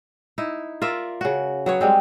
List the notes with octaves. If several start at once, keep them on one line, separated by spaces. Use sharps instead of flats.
D#4 E4
F4 A#4 D5 E5
C#3 F#4
F#3 B3 C#5
G3 G#3 C4